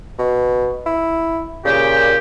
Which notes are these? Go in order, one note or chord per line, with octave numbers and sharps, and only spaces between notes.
B2
E4
A#2 C#3 G4